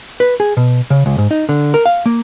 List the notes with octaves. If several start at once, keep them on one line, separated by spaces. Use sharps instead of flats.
B4
G#4
B2
C#3
C#2
G#2
D#4
D3
A#4
F5
A#3